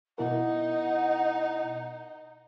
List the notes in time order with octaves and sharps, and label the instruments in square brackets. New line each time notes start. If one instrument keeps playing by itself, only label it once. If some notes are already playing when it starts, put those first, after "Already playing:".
[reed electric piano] B2 E4 A#4 [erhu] D#4 [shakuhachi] F#5